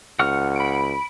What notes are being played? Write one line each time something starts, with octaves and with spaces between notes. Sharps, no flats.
C#2 F#5 C#6 F6
B5 D7